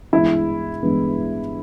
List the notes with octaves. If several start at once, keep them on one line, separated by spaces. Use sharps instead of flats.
G2 E3 G#3 B3 E4
G2 E3 G#3 B3